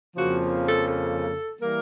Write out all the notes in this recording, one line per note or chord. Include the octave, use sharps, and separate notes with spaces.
F2 C#3 F3 A#3 F#4
A4
A4
E3 G3 A#3 A#4